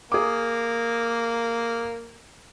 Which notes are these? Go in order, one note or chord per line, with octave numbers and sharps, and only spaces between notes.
A#3 G#4 D6